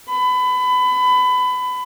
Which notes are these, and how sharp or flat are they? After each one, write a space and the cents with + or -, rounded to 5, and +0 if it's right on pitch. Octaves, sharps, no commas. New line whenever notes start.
B5 +25